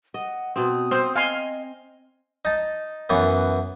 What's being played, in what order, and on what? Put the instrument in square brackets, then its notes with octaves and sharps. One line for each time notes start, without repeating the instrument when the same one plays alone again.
[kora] D#5 [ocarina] F#5
[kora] B2 C4 [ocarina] D#6
[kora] C4 [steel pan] C5
[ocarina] D#5 [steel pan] F5 G#5 C6
[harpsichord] D#4 A5
F#2 E3 B3